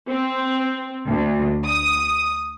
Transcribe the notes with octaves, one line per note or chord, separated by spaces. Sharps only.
C4
D2
D#6